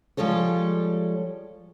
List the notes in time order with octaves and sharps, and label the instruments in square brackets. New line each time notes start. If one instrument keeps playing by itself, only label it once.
[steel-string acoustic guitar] F3 G3 G#3 A4 C#5